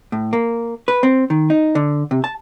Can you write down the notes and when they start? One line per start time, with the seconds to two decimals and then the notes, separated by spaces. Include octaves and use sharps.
0.12 A2
0.33 A#3
0.88 B4
1.03 C4
1.30 D#3
1.50 D#4
1.75 D3
2.11 C3
2.24 A5